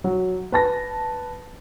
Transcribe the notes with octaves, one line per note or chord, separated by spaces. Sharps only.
F#3
B4 A5 A#6